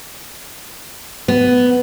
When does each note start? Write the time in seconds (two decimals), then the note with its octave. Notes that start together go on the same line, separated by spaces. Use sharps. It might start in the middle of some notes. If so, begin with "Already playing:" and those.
1.28 B3